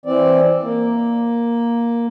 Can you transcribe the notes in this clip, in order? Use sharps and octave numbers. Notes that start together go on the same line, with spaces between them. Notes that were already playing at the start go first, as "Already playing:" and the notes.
E3 C4 D5
A#3